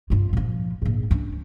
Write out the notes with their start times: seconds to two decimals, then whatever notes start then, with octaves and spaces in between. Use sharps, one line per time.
0.10 G2 F4
0.33 A#2 F3
0.82 A#1 G#2
1.11 C#4 D4